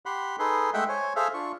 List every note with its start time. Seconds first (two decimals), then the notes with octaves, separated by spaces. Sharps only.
0.06 G4 F#5 B5 C6
0.39 D#4 G#4 A4 B4 C6
0.74 G#3 A3 E5 F#5 G5
0.89 C5 C#5 G#5
1.16 G#4 A4 C5 E5 F5
1.34 D4 F4 C#6